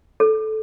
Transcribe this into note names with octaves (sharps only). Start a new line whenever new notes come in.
A4